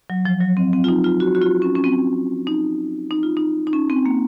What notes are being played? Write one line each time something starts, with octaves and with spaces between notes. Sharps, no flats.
F#3
F3
F#3
C4
C4
F4
D#4
F4
F#4
F#4
F4
C#4
C#4
C4
D#4
D#4
F4
D#4
D#4
C#4
C4
A#3